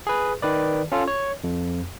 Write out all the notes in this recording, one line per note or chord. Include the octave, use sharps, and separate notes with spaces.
G#4 B4
D#3 B4 D5
C#4 F4 A4
C#5
F2